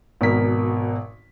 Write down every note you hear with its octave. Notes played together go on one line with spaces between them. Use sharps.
G#1 B2 A#4 B6